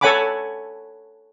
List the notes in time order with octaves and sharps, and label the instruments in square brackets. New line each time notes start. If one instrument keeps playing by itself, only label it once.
[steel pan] A4 C#5 F#5 G#5 B5 D6